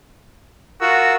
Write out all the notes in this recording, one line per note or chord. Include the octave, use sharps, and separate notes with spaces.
F4 F#4 A#4 E6